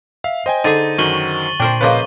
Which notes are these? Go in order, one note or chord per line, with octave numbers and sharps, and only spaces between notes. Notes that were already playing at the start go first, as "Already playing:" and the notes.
E5 F5
C5 D#5 G5 G#5
D3 D#4 G#4 A6 D#7
F#2 D#3 F#4 G#5 C#6 F#7 G7
A#2 D4 A#4 C5 G5
C#3 F3 A#3 B4 C5 D#5